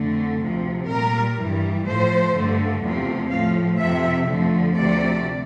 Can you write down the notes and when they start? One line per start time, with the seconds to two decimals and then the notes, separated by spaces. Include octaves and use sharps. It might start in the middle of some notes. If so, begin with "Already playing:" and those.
Already playing: F2 D3 A3
0.40 D2 C3 F3
0.89 A#2 G3 A#4
1.37 G2 E3 G3
1.85 A2 F3 A3 C5
2.34 G2 D3 A3
2.83 E2 C3 F3 A3
3.31 A2 F3 A3 F5
3.79 F2 C3 F3 E5
4.28 F2 D3 F3 A3
4.76 D2 C3 F3 A3 D5